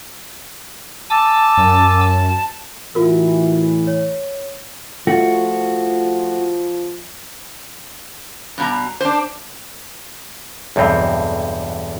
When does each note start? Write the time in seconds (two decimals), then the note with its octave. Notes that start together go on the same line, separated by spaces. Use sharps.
1.10 G#5 A5 D6 E6
1.57 F#2
2.95 A2 E3 F4 F#4 A#4
3.87 C#5
5.07 F3 A3 F4 F#4
8.58 G2 B2 A#5
9.00 D4 C5
10.76 B1 E2 G2 C4